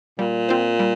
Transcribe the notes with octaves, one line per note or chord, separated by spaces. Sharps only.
A#2 G3
C4 F4 C5
G3